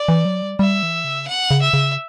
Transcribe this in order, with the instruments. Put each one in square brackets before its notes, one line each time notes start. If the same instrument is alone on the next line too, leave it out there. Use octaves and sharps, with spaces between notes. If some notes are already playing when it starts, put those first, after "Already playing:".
Already playing: [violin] D5
[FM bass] E3
F#3
G3
[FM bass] G3 [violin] E5
[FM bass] E3
C#3
[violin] F#5
[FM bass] C#3
[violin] E5
[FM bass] C#3